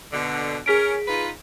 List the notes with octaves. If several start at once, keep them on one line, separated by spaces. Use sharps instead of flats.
B2 D3
C#4 G#4 A#4 B6 D7
D#4 F4 B4